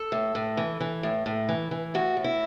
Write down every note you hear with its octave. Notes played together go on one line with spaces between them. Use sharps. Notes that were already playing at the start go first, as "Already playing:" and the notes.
Already playing: A4
A2
A2
E3
E3
A2
A2
E3
E3
A2 F#4
A2
E4